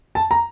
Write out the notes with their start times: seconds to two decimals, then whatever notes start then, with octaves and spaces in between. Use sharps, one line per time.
0.15 A5
0.31 A#5